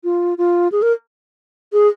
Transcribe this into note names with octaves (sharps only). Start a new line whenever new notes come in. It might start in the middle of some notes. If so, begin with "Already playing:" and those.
F4
F4
G#4
A#4
G#4